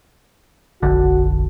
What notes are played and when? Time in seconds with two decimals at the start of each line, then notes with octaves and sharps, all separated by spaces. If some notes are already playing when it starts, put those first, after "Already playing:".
0.83 F1 A#1 D3 F#4